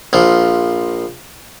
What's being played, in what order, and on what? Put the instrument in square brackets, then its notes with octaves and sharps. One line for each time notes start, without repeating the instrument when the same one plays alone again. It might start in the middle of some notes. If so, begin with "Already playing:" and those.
[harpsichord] A#1 F3